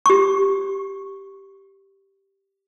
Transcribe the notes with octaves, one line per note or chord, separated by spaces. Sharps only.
G4 C#6